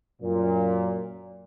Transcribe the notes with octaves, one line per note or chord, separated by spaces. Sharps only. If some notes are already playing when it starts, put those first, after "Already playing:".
F#2 A#2